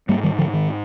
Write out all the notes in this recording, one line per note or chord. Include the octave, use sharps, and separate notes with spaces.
G#2 G3 A#3
D#3 G3
D3 F3
D#3